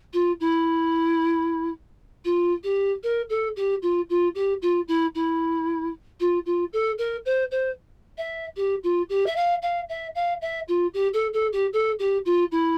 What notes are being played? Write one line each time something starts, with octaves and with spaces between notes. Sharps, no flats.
F4
E4
F4
G4
A#4
A4
G4
F4
F4
G4
F4
E4
E4
F4
F4
A4
A#4
C5
C5
E5
G4
F4
G4
E5
F5
F5
E5
F5
E5
F4
G4
A4
A4
G4
A4
G4
F4
E4